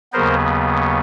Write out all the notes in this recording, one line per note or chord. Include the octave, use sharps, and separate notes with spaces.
D#2 C#3 F#3 B3 A#4 C5